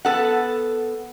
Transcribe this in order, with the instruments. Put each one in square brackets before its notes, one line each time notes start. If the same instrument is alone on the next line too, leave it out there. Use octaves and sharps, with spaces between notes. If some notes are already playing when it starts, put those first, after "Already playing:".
[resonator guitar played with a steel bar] B3 A4 F#5